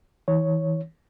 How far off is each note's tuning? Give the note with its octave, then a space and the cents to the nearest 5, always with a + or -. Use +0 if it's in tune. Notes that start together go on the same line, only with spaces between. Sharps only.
E3 -35 C#5 +0